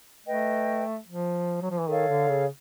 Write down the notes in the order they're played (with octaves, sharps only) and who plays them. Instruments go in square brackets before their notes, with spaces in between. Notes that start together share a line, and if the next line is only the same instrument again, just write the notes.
[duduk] A3 [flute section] B4 D#5 G5
[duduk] F3
F#3
F3
E3
[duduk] D#3 [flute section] A4 C#5 F5
[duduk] D3
C#3